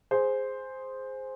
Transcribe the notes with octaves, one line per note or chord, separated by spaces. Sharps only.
G#4 C5